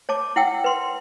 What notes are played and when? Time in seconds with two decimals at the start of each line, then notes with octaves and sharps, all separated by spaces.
0.09 C#5 A5 D6
0.36 E4 F#5 G5 E6
0.64 B4 C6